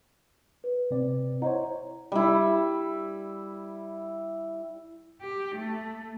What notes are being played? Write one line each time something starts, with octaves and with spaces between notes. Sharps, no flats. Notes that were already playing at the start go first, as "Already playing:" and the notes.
B4
C3 C4 D5
E4 C5 C#5 D#5 F#5 A#5
G3 E4
G4
A3